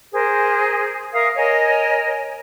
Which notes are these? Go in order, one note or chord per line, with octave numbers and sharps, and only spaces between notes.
G#4 A#4 C5
A#4 E5 F5 D#6
A#4 C#5 D#5 G#5